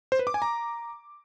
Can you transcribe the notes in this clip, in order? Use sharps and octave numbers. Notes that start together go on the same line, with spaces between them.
C5
B4
D6
G#5
A#5